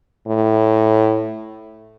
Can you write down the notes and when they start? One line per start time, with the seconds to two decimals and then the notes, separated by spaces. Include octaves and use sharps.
0.28 A2